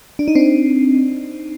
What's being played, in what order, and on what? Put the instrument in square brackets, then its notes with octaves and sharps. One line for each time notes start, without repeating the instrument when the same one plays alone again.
[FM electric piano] D4
D#4
C4 D4